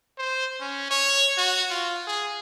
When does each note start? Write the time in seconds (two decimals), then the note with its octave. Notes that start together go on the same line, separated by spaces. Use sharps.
0.18 C5
0.60 C#4
0.91 C#5
1.37 F#4
1.71 F4
2.07 G#4